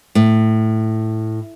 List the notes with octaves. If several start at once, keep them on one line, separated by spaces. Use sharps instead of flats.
A2